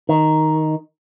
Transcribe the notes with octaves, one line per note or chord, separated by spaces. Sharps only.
D#3